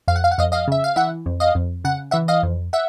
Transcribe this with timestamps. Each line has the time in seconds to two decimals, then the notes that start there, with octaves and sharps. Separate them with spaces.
0.08 F2 F5
0.16 F#5
0.24 F5
0.31 F#5
0.38 F2 D#5 F5
0.52 D#5 F5
0.68 C#3 E5
0.84 F5
0.96 E3 E5 F#5
1.26 F2
1.40 D#5 F5
1.55 F2
1.84 C#3 F#5
2.11 E3 E5 F#5
2.28 D#5 F5
2.43 F2
2.73 E5 F#5